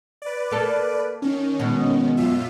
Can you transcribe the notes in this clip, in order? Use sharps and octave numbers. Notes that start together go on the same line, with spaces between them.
B4 D5
A#3 A4
D#3 C#4
B2 G#3
F#2 F4 E5